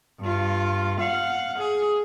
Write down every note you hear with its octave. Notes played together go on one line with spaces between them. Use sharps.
G2 F4
F5 F#5
G#4